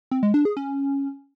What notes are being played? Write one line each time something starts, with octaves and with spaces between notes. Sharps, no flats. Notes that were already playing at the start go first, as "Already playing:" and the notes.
C4
G#3
D4
G#4
C#4